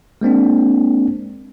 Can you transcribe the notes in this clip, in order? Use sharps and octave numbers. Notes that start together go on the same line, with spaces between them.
G#3 A#3 C4 D4